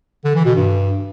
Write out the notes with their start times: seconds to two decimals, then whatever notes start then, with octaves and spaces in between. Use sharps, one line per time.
0.24 D3
0.35 E3
0.45 B2
0.56 G2